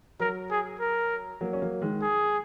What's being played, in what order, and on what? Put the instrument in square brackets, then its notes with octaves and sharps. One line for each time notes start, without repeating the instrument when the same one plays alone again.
[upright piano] F#3 [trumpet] A#4
[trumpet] G#4
A#4
[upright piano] F#3 A#3
C#4
F#3 A#3
D#3 G#3
[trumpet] G#4